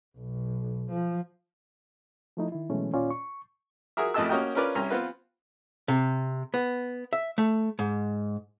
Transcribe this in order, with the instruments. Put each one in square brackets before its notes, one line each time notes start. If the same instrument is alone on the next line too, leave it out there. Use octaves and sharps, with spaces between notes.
[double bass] B1
F3
[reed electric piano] F3 A3 D#4 E4
D#3 E4
B2 E3 F#3 G#3 A3 C#4
D#2 A#2 C#4 F4 D5
C#6
[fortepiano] F#4 G#4 A#4 E5
A1 F2 A3 D#5 A5 E6
A#3 C#4 F#4 A#4 D#5 G5
C#4 F4 A#4 B4 D5
C2 C#4 A#5
B3 C4 F4 B4
[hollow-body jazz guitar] C3
B3
E5
A3
G#2